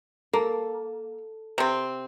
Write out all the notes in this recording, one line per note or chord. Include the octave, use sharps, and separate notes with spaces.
A#3 A4
C3 C4